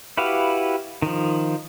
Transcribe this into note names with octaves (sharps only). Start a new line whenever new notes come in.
E4 F#4 G4 B4 F5
D#3 F3